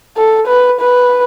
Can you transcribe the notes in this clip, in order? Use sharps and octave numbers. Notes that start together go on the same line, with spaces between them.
A4
B4
B4